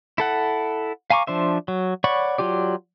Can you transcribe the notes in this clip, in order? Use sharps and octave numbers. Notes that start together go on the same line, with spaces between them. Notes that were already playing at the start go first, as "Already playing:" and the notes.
E4 A4 F#5
F5 G#5 A#5 C#6 D6
F3 D4 C5 E5
F#3
C#5 D5 F#5 B5 C#6
F#3 F4 G4 D5